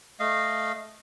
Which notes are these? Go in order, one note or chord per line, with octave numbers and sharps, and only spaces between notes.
A3 D#5 F5